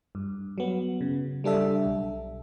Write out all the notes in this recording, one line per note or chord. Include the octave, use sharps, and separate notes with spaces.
G2
F#3 B3
C#3
G3 D4 A4 E5
B1